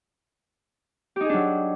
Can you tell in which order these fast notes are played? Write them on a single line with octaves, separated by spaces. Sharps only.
G4 D#4 G#4 D4 F#3